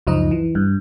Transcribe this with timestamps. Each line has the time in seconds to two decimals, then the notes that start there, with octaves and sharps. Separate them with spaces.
0.07 C#2 F#2 F3 D#4 D#5
0.31 E3
0.55 G2